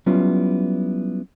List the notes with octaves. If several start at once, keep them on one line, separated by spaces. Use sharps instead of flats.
F#3 G3 B3 C#4 E4 F4